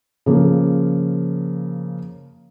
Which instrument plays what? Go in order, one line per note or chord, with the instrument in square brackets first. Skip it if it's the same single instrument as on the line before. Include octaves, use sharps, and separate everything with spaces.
[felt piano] C#3 F3 A#3